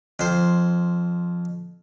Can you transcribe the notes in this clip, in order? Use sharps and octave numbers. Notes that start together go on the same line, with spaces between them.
F2 C5